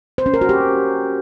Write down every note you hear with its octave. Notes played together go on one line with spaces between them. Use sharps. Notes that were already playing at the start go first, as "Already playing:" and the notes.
C5
C#4
A#4
F#4
G4